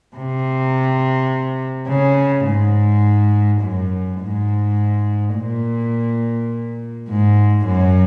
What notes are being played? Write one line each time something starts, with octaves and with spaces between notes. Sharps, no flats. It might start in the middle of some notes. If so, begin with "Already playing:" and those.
C3
C#3
G#2
F#2
G#2
A#2
G#2
F#2